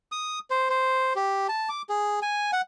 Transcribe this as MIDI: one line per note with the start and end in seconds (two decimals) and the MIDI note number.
0.12 0.39 87
0.50 0.69 72
0.70 1.13 72
1.16 1.47 67
1.49 1.69 81
1.69 1.82 86
1.89 2.20 68
2.22 2.51 80
2.53 2.61 78